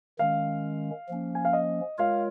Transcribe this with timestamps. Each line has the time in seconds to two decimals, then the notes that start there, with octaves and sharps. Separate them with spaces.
0.19 D#3 G#3 C#4 F5
1.09 F3 A#3 C#4
1.35 G#5
1.45 F5
1.53 D#5
1.98 G#3 F4 A#4 C#5 F5